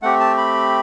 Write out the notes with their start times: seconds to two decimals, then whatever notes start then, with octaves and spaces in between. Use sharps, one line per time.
0.02 A3 C4 G4 F#5
0.20 A5
0.37 B5